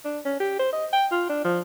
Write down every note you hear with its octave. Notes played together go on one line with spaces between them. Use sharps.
D4
C#4
G4
C5
D#5
G5
F4
D4
F3